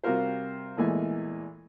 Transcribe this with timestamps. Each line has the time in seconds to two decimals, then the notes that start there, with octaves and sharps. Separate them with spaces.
0.04 C3 G3 F4 F#4 A#4 C5
0.77 E2 A#2 E3 G#3 A3 G#5